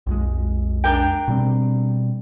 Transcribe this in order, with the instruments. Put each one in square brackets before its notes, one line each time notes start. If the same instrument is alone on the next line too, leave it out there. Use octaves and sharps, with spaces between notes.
[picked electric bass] B1 F2 G#3
[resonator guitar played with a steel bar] D4 A#4 G5
[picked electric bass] B2 G3 C4